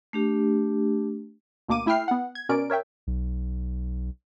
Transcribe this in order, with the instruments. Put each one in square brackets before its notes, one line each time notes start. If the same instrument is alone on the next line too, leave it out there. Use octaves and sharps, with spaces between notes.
[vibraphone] A3 D4 G4
[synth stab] D2 B2 A#3 D6 D#7
A3 E4 E5 G5 F6 C7
B3 F#5
G#6
B2 C#4 A#4 D5 D7
A#4 C#5 E5 G5
[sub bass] B1